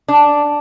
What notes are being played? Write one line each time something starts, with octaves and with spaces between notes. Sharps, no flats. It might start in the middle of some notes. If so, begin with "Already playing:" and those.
D4